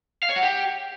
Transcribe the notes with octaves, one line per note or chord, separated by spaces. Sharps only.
F5
C#5
F#5
G4